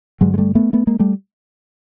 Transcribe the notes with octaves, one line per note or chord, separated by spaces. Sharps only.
G2 D3 F#3 G#3
G#3
G3 A3
A3 B3
A3 B3
G#3 A#3
G3 A3